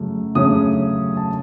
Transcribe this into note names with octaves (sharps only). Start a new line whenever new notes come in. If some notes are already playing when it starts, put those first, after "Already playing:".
Already playing: F#2 C#3 F#3 A3
F#2 C#3 F#3 A3 C#4 D#6
A5